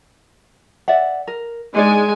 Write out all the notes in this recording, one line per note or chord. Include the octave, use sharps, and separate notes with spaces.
D5 E5 F#5
A#4
G#3 D4 D#4 D5 G#5